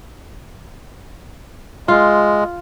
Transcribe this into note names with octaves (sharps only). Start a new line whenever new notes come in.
G#3 F4